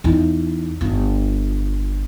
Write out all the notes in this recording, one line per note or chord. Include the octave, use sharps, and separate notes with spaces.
E2 D#4
G1 F4